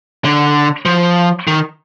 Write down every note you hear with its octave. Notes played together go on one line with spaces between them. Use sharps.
D3
F3
D#3